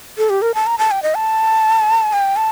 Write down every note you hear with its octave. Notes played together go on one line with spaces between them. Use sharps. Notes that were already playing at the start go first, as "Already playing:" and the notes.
A4
G4
A#4
A5
A#5
A5
G5
D#5
A5
G5
A5